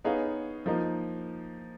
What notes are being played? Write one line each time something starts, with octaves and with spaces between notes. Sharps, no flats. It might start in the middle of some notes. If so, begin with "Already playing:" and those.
B3 D#4 G#4 C#5 F5
F3 A#3 D#4